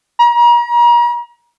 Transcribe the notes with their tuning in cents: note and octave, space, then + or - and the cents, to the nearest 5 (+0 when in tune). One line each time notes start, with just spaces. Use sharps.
A#5 +40